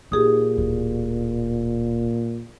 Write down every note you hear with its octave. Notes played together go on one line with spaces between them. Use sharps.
A#2 D#4 G4 G#4 D#6
D1 A2